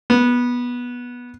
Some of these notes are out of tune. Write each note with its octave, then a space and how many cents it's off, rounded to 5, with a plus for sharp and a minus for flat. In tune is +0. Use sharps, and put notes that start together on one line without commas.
B3 -15